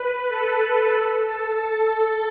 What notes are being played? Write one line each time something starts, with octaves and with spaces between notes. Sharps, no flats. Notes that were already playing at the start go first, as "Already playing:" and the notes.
Already playing: B4
A4
A4
A4